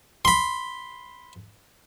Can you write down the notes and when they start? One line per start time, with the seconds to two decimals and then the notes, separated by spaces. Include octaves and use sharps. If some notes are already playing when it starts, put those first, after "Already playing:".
0.25 B5 C6